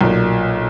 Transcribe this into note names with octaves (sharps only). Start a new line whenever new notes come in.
B1 A#2